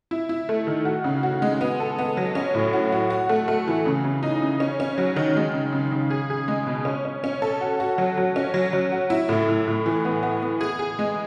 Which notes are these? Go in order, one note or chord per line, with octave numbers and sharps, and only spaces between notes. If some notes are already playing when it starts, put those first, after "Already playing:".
E4
E4
A3
D#3
F#4
C#3
F#4
G#3
B3
A4
B3
F#3
C#4
A2
F#4
F#4
F#4
A3
A3
E3
C#3
C#3
D#4
C#3
C#4
C#4
F#3
D#3
G#3
C#3
C#3
C#3
G#4
G#4
G#3
B2
C#4
C#4
C#4
A4
F#4
F#4
F#3
F#3
C#4
F#3
F#3
F#4
E4
A2
A2
A2
E3
B3
B3
B3
G#4
G#4
G#3